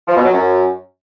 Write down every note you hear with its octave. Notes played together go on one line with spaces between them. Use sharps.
F3
B2
F#3
F#2